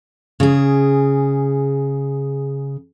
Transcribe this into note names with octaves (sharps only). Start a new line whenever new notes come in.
C#3 G#4